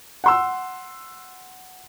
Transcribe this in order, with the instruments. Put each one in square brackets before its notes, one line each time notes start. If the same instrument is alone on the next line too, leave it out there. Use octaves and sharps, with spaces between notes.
[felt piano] F#5 C6 E6